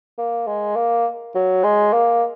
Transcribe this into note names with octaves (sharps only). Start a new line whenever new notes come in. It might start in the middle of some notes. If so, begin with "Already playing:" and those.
A#3
G#3
A#3
F#3
G#3
A#3